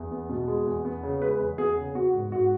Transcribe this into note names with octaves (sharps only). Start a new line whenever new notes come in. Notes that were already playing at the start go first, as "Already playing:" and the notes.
Already playing: E2
B3
B2
G#3
E2
B3
C#3
G#3 B4
E2
B3 G#4
C#3
B3 F#4
G#2
G#2 F#4